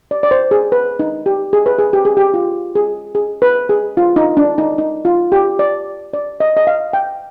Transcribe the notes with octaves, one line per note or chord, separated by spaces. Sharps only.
D5
D5
C5
G#4
B4
D#4
G4
G#4
B4
G#4
G4
G#4
G4
F4
G#4
G#4
B4
G#4
F4
D#4
D4
D#4
D#4
F4
G4
D5
D5
D#5
D#5
F5
G5